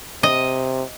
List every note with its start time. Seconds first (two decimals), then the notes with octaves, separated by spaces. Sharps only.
0.23 C3 D#5